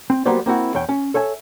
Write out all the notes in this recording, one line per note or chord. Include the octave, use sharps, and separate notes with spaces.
C4
F#3 G3 A#3 B3 C5 D5
A#3 C4 E4 F#4
E2 C#5 G5
C#4
A4 C#5 E5 G#5